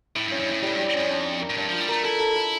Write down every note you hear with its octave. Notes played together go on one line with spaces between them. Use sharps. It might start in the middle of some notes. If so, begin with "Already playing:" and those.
A2 E4
G2
C#4
G2
A2 E4
A2 G3
G2
G3
F2 C#4
D4
D4
A#4
A2
G2 D4
F3 F4
G3
A3 A#4
E4 A4
A4
A4